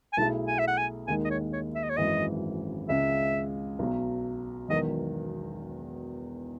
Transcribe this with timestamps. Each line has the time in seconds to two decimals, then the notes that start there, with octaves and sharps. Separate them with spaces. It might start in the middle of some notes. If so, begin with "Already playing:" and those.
0.13 G#5
0.17 B1 B2 A3 E4 G#4 A5
0.48 G#5
0.59 E5
0.68 F#5
0.77 G#5
1.07 D#2 D#3 G#3 D#4 G#5
1.24 D#5
1.30 C#5
1.53 C#5
1.75 E5
1.83 D#5
1.89 C#5
1.97 G#1 F#2 E3 G#3 D#5
2.89 C#2 C#3 G#3 E5
3.79 B1 B2 F#3
4.69 E1 E2 D#3 F#3 D#5